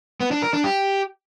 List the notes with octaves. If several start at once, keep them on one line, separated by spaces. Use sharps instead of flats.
B3
D4
A#4
D4
G4